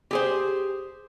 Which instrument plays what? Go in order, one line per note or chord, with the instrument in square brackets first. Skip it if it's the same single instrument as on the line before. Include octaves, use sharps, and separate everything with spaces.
[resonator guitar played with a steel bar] G4 G#4 C5